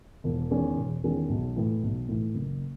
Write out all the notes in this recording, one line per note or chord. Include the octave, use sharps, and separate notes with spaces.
E1
E2 D#3 G#3 C#4
E1
E2 D#3 G#3 C#4
B1
A2 E3
B1
A2 E3
F#1